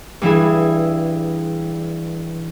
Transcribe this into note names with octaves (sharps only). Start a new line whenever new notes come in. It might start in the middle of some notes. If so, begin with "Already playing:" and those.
G2 E3 E4 G#4